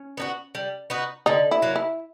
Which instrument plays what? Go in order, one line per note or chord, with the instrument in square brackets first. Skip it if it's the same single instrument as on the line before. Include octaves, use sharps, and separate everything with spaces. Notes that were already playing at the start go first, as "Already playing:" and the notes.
Already playing: [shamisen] C#4
[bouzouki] B3 D#4 F#4
G3
B3 D#4 F#4
[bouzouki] D3 [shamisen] D#4
[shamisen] E4
[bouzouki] F#3 A#3
[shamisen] E4